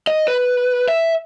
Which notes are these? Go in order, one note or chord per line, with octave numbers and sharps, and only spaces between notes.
D#5
B4
E5